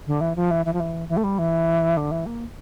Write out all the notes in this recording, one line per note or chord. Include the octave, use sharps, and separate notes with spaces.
D3
E3
F3
E3
E3
F3
E3
E3
A3
G3
E3
D3
E3
A#3